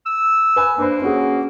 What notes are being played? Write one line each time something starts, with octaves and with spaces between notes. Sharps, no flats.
E6
B4 G#5
A#3 D4 B4 C5
C#4 F#4 G#4